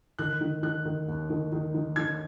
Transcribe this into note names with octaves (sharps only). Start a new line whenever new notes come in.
D#3 F#6
D#3
D#3 F#6
D#3
D#2
D#3
D#3
D#3
D#3 G#6